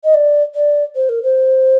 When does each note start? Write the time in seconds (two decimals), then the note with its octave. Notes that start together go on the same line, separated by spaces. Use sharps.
0.04 D#5
0.14 D5
0.55 D5
0.95 C5
1.09 A#4
1.23 C5